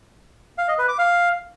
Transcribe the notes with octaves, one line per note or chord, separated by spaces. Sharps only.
F5
D#5
B4
D6
F5